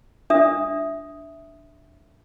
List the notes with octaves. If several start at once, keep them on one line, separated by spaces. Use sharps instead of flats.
D4 E5 D#6